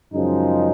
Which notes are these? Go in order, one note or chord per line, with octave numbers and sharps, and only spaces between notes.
F#2 C#3 F3 G#3 D#4